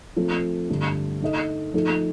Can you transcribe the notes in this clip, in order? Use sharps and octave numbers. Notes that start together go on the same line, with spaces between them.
F3 A3 C4 F4 A4
G2 D3 A3 D4
A3 D#4 A4 D#5
F3 A3 D#4 A4